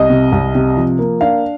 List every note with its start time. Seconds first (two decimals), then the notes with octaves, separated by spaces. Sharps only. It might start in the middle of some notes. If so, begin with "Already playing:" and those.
Already playing: C2 D#5
0.10 C3
0.32 C2
0.55 C3
0.77 F3
0.99 A#3
1.21 D4 F5